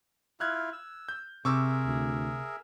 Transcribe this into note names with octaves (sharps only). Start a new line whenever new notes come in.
E4 F4 F6 F#6 G#6
E6
G6
C3 G#4 A#4 E5 C#6 D6 E6
D2